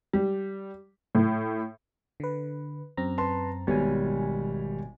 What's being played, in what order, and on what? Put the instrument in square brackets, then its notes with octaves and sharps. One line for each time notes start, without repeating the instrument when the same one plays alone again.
[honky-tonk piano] G3
A2
[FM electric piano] D3 B4
F#2 C4 A#5
[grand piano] B4 A5 C6
[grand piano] G#1 G3 C#5 [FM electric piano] B2 G#5